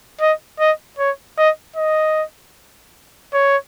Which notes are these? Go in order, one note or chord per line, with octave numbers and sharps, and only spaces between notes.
D#5
D#5
C#5
D#5
D#5
C#5